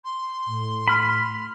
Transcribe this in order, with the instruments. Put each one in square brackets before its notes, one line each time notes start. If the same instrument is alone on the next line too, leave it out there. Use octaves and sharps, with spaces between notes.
[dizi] C6
[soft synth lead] A2
[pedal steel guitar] B5 F6